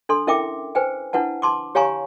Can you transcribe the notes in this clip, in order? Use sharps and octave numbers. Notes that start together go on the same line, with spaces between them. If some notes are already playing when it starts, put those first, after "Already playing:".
D4 A4 C6
C#4 E4 A#4 E5 G5 D6
B4 C5 G5 G#5
D4 E4 B4 F#5 A5
A5 C6 D6
G4 C#5 F5 G#5 A#5 C#6